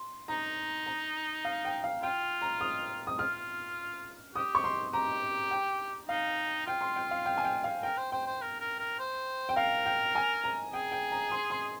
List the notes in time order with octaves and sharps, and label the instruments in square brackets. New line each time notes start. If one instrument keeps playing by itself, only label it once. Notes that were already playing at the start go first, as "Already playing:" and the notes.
Already playing: [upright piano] C6
[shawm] D#4 [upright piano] A#5
[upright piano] A#5
F5
G5
F5
[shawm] F4 [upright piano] G5
[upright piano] A#5
D#6
D#6
[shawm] F4 [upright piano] F6
[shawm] G4 [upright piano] D#6
[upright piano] C#6
C6
[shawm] G4 [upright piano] A#5
[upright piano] G5
[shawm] D#4 [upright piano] F5
[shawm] F4 [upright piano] G5
[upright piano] C6
G5
F5
G5
G#5
G5
F5
[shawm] A#4 [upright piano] G5
[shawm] C5
[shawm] C5 [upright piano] G5
[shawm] C5
A#4
A#4
A#4
C5
[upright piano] G5
[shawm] A#4 [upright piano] F5
[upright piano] G5
G#5
A#5
[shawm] G#4 [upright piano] G5
[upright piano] G5
A#5
C6
C6